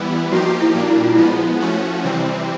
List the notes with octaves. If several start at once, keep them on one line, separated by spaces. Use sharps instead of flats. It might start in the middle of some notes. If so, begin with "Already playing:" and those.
Already playing: E3 G3 B3 E4 G4
F3 A#3 D#4 F#4 G4
F#4
E4
A#2 G3 A#3 D4
E4
F4
E4
F3 G#3 B3 F4
F3 A3 C#4 F#4
C3 E3 G3 C4